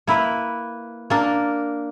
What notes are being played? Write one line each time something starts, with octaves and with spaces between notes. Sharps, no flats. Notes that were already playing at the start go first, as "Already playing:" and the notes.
A#3 E4 B4
A#3 D4 A#4